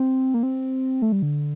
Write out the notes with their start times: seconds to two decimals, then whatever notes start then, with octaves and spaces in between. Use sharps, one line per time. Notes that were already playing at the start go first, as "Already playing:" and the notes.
Already playing: C4
0.34 A#3
0.43 C4
1.02 A3
1.12 G3
1.22 D3